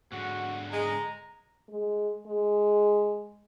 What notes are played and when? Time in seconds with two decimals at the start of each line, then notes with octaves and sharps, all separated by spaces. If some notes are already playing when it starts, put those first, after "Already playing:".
0.12 G#2 D3 F#4
0.72 G#3 A#5
1.69 G#3
2.26 G#3